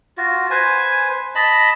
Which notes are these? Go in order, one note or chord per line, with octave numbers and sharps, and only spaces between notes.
F4 F#4
B4 C5 G#5
D#5 A5 B5